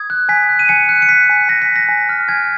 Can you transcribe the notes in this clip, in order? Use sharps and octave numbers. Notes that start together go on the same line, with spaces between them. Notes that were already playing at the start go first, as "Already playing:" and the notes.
Already playing: D#6 G#6
F#6
G#5 B6
F#6
D#7
G#5 C#7
F#6
C#7
F#6 B6
G#5
G#5 A#6
B6
G#5
A#6
G#5
F6
G#5 G#6